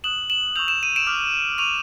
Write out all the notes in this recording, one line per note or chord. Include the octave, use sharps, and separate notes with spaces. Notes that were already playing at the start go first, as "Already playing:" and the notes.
D#6 F#6 E7 F#7
E7 F#7
C#6 E6 G6 F7
E7
D#7
D7 E7
D6 F6
C#6 F6 D#7 F7